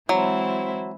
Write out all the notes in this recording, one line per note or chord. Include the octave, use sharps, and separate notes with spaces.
E3 F#3 G#3 C4 E4 C5